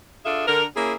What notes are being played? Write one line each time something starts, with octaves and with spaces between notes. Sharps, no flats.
D4 F4 G#4 A4 E5
D3 A#4
A#3 C#4 E4 G#4